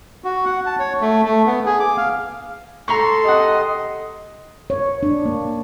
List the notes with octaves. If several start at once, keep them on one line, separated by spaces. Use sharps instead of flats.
F#4
F#5
A5
C#5
A3
A3
B3
G#4
D6
F5
A4 A#5 C6 C#6
C3 D#5 F#5
C#5
D4
A#3